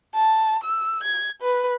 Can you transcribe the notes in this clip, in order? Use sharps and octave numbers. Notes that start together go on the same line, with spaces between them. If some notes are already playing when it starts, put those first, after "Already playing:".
A5
E6
G#6
B4